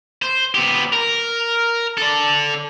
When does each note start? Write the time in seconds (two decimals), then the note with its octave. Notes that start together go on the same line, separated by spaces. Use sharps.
0.22 C5
0.55 B3 G4
0.93 A#4
1.97 A4 D5